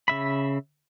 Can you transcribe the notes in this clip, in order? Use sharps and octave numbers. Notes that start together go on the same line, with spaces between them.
C#3 E5 B5